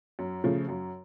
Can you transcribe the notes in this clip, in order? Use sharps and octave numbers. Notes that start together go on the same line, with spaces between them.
F#2
C#3 F3 A3
F#2